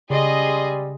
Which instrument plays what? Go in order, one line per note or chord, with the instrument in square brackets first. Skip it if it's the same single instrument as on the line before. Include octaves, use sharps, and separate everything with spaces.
[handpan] C#3 [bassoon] G3 [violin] G#4 [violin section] D#5 C6